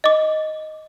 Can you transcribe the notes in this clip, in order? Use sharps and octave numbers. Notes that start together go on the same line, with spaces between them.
D#5 D6